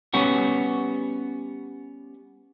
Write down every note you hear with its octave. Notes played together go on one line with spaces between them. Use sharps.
G3 B3 C#4 F#4